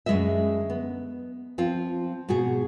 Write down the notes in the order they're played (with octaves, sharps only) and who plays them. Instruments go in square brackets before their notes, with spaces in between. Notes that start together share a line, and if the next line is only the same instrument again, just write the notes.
[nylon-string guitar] F#2 D3 G#3 G#4 D#5 E5
B3
F3 C4 F4
G#2 B2 F#4 G#4